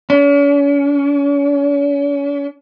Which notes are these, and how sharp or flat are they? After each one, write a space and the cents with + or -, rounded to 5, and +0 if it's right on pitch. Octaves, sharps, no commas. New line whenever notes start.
C#4 +40